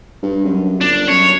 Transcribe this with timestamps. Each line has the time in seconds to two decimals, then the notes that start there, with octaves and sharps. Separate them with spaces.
0.23 G2
0.45 F#2
0.81 G1 D4
1.08 F#2 C#5